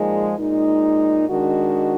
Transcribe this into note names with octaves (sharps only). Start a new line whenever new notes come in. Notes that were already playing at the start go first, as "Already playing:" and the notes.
Already playing: A#2 F3 G#3 D#4
A#2 G#3 D#4
D#3 G#3 D4 F#4